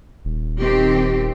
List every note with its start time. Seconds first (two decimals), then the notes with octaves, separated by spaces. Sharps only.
0.25 D#1
0.59 D#3 C4 G4